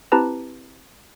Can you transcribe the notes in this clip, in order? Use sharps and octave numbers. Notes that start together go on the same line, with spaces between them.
C4 E4 G4 B4 A5 A#5